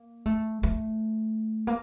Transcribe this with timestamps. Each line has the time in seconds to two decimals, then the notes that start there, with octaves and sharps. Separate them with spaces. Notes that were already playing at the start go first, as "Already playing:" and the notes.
Already playing: A#3
0.26 A3
0.63 A3
1.67 A#3